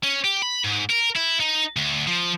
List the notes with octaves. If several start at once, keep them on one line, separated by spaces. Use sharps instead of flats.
C#4
G4
B5
G#2
A#4
E4
D#4
D2
F3